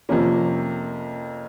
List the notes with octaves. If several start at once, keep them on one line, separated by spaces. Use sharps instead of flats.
F2 C3 F3 A#3 C#4